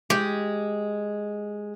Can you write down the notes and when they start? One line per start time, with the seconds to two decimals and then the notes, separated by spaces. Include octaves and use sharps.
0.10 G#3 G4